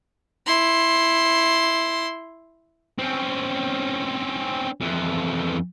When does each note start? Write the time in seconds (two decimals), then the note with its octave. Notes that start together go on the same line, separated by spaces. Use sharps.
0.46 E4 C6
2.98 C4 C#4
4.81 F2 E3